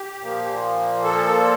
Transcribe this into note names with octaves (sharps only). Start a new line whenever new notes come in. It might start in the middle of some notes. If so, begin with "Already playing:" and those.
Already playing: G4
A#2 F3 A#3
A4